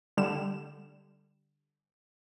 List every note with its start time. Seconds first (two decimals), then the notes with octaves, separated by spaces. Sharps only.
0.17 D3 G3 E7